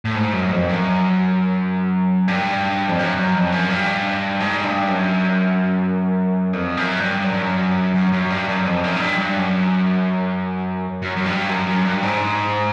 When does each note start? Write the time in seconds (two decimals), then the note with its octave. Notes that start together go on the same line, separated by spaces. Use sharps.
0.05 A2
0.15 G#2
0.33 F#2
0.51 F2
0.69 F#2
2.28 G2
2.88 F2
2.99 F#2
3.17 F#2
3.34 F2
3.52 F#2
3.70 G2
4.40 G#2
4.64 G2
4.88 F#2
6.53 F2
6.77 F#2
7.01 G2
7.24 F#2
7.32 G2
7.40 F#2
7.94 F#2
8.13 F#2
8.30 G2
8.48 F#2
8.66 F2
8.83 F#2
8.96 G#2
9.01 G2
9.19 G2
9.37 F#2
11.02 F#2
11.16 F#2
11.26 G2
11.49 F#2
11.67 F#2
11.85 G2
12.03 G#2